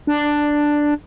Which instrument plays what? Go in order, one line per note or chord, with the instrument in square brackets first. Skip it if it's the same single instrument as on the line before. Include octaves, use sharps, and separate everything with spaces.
[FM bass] D4